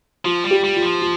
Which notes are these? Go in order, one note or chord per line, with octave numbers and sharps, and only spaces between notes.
F3 F4
G3
G4
G3
F4
F3
F4